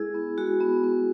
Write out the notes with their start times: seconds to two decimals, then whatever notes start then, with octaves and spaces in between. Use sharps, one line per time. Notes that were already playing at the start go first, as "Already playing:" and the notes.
Already playing: G#3 E4 G#4
0.14 B3
0.38 G#3 F#4
0.60 B3
0.84 B3